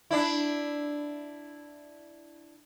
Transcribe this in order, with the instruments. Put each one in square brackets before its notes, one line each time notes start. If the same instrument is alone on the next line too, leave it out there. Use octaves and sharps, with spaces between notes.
[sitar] D4 E4